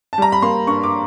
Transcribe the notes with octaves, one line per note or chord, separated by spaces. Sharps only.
A5
G3 A#5
B5
A#3 C6
G2 C#6
D6